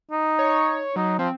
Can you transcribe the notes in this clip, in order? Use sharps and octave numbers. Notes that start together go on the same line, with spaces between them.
D#4
C#5
F#3 D#4
F3 C4